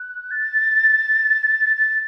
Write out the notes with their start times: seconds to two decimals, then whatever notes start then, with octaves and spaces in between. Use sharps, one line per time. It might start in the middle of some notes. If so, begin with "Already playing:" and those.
Already playing: F#6
0.31 A6
1.77 A6